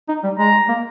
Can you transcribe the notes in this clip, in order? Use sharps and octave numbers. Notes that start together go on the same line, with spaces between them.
D#4
G3
G#3 A#5
A#3